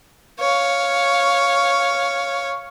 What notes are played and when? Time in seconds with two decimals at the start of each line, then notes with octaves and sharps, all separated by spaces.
0.40 C#5 F5